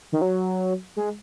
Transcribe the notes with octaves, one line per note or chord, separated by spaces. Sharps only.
D#3
F#3
G#3